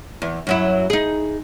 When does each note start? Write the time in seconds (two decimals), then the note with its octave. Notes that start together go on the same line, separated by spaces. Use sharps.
0.22 E2
0.47 F#2 F#3 E4
0.90 D#4 G#4